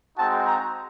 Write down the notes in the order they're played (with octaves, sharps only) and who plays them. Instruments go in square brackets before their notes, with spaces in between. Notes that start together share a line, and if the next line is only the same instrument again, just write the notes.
[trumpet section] G#3 C4 D#4 F#4 A5
A#5